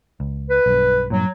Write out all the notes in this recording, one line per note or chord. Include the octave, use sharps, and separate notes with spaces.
C#2
B4
B1 G2
G2 A#2 F#3